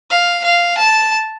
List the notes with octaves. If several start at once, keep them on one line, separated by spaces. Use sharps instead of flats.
F5
F5
A5